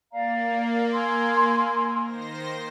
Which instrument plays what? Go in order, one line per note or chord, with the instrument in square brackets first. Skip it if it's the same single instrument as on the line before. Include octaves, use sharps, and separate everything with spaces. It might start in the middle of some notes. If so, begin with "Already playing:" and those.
[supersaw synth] A#3 [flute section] D5 F5 A#5
[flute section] G#5 C6 E6
[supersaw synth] D#3 C5 A#6